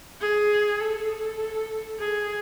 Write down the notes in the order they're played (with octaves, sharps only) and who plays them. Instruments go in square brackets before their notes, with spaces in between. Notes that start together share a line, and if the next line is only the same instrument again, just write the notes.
[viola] G#4
A4
G#4